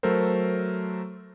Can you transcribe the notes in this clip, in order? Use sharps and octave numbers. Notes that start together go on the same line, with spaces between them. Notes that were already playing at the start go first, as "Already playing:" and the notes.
F#3 A3 A4 A#4 C5